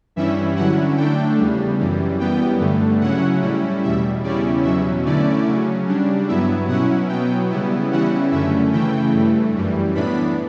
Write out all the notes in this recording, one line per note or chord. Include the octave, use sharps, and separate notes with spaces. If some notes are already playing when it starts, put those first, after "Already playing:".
G2 E3 G3 C#4 E4 E5
D3 F#3 C#4 E4 F#5
D3 A3 D4 G5
E2 C#3 G3
F#2 E3 G3
F#2 E3 G3 B3 G5
G2 D3 A3
C#3 F#3 C#4 E4 F#5
A2 G3 C#4 E4
E2 B2 G3 E5
E2 C#3 G3 C#4 E4 D5
E2 B2 F#3 C#4 E5
D3 A3 C#4 E4 D5
C#3 F#3 C#4
C#3 G3 D4
G2 F#3 B3 E4 E5
B2 F#3 C#4 E4 F#5
B2 F#3 B3 G5
C#3 G3 B3 E4
C#3 E3 G3 C#4 E4 F#5
F#2 D3 A3 C#4 E5
C#3 E3 A3 E4 G5
G2 E3 A3
F#2 E3 G3
A2 E3 B3 D4 B5